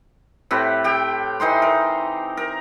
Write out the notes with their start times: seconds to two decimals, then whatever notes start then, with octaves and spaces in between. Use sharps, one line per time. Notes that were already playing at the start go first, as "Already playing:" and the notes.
0.51 A2 C4 G4 B4
0.84 G4 G5
1.40 E3 D#4 C5 C6
1.62 A#4
2.37 A#4